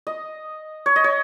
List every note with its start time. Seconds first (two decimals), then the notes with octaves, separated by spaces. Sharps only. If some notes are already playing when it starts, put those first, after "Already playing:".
0.07 D#5
0.86 C#5
0.96 D#5
1.04 C#5